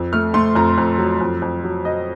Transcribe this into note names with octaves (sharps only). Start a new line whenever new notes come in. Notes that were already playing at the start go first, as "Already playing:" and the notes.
Already playing: F2
A3 F6
A3 C6
F2 A#5
F2
F#3
F2
F2
F#3
F#3 D#5